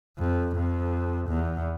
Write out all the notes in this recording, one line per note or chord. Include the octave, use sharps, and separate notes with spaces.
F2
F2
E2